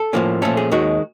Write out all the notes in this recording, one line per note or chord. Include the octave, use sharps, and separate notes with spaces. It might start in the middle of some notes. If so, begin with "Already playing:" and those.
Already playing: A4
A2 F3 A#3 C#4
A#2 F3 A3 C#4 A4
G#4
D#2 D#3 G#3 F#4